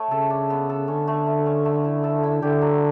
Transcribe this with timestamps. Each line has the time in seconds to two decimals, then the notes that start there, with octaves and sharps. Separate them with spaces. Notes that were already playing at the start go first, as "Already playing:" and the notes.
Already playing: A3 C#5
0.11 C#3 A4
0.30 D4
0.50 B3
0.69 A4
0.88 D3 C#4
1.07 A3
1.27 A3
1.46 C#4
1.65 A3
1.84 E4
2.04 A4
2.23 E4
2.42 D3 G4
2.62 F#3